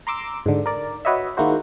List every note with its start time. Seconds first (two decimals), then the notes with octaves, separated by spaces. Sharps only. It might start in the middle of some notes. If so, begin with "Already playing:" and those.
0.07 A#5 C6 D6 E6
0.46 G#2 D3
0.66 A#4 D5
1.05 F#4 B4 C#5 D#5 E5
1.37 D#3 G#3 A#3 E4 F#4 C5